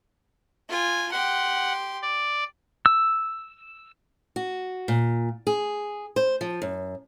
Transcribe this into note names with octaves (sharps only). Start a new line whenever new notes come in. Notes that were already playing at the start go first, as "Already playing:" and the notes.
F4 G#5
G4 F#5 C6
D5
E6
F#4
A#2
G#4
C5
F3
F#2